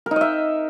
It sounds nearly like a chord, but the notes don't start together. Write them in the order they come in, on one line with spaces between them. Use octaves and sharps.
A#4 D#4 D#5 E5